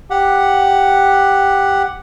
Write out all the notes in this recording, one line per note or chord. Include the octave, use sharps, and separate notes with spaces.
G4 F#5